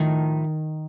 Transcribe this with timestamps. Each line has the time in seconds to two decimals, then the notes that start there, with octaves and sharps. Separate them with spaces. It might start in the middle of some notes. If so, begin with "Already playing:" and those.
Already playing: A2 D#3 F3 A3 D#4